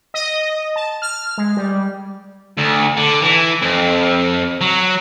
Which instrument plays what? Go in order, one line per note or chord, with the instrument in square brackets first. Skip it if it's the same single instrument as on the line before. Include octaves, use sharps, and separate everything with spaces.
[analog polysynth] D#5
A5
F6
G#3
G3
[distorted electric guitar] D2
D3
E3
F2
F#3